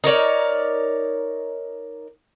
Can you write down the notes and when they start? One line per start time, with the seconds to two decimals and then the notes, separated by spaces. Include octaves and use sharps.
0.04 D#4 A#4 C#5 D5